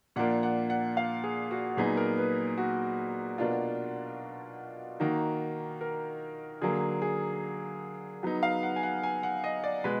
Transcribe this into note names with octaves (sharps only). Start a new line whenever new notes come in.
A#2 F3 A#3 D4 F#5
F#5
F#5
F5
G#4
F#4
A#2 F#3 B3 D#4 G#4
A#4
B4
F#4
B2 A#3 D4 F4
D#3 A#3 D#4 F#4
A#4
D3 F#3 A#3 G#4
G#4
F#3 B3 D#4
F5
F#5
G#5
F#5
G#5
F#5
D#5
D5
B2 G#3 B4